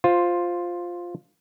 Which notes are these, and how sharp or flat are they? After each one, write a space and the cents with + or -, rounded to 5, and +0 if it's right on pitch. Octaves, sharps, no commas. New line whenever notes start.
F4 +5 C5 +0